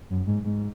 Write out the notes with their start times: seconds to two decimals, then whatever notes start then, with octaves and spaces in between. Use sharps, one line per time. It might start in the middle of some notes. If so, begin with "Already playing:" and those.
0.10 F#2
0.27 G#2
0.44 G#2